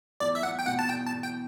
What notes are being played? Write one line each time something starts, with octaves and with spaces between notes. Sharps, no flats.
E2 D5
E5
E2 F#5
G5
B2 F#5
A5
E2 G5
A5
E2
G5